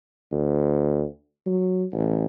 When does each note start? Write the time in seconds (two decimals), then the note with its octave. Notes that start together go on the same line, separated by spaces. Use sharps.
0.32 D2
1.46 F#3
1.92 A1